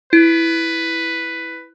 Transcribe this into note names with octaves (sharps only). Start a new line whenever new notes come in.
E4 B4